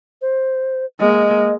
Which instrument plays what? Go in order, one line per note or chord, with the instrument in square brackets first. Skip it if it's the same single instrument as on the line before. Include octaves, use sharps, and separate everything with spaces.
[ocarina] C5
[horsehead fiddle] G#3 A#3 [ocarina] D#5